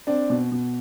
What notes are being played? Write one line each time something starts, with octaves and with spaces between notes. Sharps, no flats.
C4 D4
B2
B2